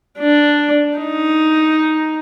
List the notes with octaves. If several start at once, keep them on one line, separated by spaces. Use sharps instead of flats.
D4
D#4